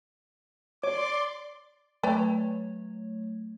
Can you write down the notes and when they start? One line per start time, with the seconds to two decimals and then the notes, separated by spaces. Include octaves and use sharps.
0.84 C#5 D5 C6 D6
2.03 F#3 A3 B4 C#5 D5 G5